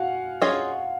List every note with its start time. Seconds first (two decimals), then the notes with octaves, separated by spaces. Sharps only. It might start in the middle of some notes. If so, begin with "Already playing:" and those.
Already playing: F#4 F5 F#5 G#5
0.42 C#4 F4 G#4 D#5